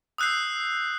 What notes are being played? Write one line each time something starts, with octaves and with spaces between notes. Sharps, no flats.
D#6 E6 F#6 G6 C7